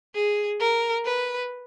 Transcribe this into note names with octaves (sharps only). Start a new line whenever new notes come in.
G#4
A#4
B4